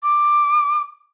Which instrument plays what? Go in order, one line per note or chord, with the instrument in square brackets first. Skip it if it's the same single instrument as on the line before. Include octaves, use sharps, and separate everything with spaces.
[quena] D6